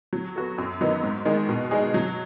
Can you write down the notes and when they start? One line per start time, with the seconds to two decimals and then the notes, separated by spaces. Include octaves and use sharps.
0.13 F#3
0.36 B3 F#4 A4
0.58 F#2
0.81 D#3 F#3 B3 D#4
1.03 G#2
1.25 D#3 G#3 D#4 G#4
1.49 B2
1.71 G#3 D#4 G#4
1.94 F#3